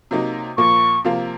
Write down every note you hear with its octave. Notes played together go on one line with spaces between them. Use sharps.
C3 F#3 A#3 D#4
A#2 F3 A#3 C#6
C3 F3 A#3 F4